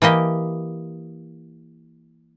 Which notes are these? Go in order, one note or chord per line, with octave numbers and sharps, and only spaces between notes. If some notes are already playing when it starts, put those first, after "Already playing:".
E3 A#3 G4 D#5